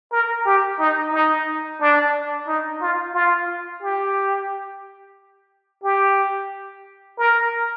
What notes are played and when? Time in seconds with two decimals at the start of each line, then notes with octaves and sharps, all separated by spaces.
0.12 A#4
0.45 G4
0.79 D#4
1.13 D#4
1.81 D4
2.48 D#4
2.81 F4
3.14 F4
3.82 G4
5.84 G4
7.18 A#4